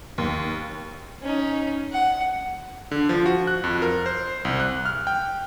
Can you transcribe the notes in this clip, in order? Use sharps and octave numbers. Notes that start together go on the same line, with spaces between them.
D#2
C#4 D#4
F#5
D3
F3
F#4
F#6
F2
A#4
C5
C2
F#6
F6
G5